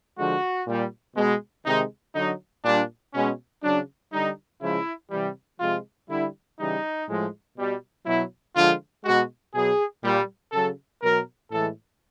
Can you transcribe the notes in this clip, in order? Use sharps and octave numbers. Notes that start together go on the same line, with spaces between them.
D3 F3 G#3 F#4
A#2 G3
B2 G#3
C3 D#3 G#3 D#4
D3 F#3 D#4
A#2 G3 D4
B2 G#3 C#4
C#3 F#3 D4
D3 G3 D#4
C#3 F3 G#3 E4
C3 E3 G3
C3 F3 G#3 F4
D3 G3 E4
C#3 E3 G3 D#4
A2 F3 G#3
B2 G3
B2 F#3 E4
D3 F3 G#3 F4
B2 G#3 F#4
B2 F#3 G#4
A#2 G3
C#3 F#3 A4
B2 F#3 A#4
A2 E3 G#3 A4